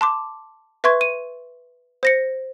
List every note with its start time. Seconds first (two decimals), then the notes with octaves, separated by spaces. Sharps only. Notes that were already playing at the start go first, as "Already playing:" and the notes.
0.01 A5 C6 D6
0.84 B4 E5 C6 C#6 G#6
1.01 D#7
2.03 C5 A#6 C#7